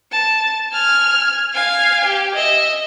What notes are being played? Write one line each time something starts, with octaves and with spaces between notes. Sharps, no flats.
A5
G#5 F6
F5 G#5
G4
D#5 E5